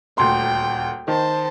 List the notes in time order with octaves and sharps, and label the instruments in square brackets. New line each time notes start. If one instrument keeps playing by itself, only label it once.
[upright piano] D#1 D2 C6 [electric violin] G5
[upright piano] D#3 [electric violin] C5 A5